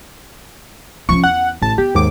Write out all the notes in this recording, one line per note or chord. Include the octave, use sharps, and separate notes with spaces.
F3 C#4 C#6
E2 F#5
A1 A2 A5
B3 G4
D#2 G#2 D6